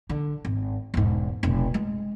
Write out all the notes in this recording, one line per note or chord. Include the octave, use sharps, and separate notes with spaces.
D3
G#1
E1 G#2
F1 B1
G#3